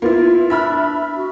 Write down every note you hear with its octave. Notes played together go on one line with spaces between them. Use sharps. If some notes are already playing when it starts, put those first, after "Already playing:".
A#3 B3 E4 F4
D4 E5 B5 F6
F#4